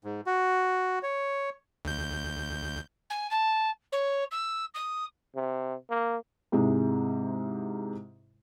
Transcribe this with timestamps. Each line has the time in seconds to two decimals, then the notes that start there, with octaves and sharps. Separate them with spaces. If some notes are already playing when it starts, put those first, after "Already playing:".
0.04 G#2
0.26 F#4
1.03 C#5
1.85 D2 G6
3.10 G#5
3.30 A5
3.92 C#5
4.31 E6
4.74 D#6
5.36 C3
5.90 A#3
6.52 G#2 C3 G#3 E4